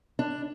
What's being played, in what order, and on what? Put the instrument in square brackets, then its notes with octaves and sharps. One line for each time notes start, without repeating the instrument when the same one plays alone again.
[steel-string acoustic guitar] D4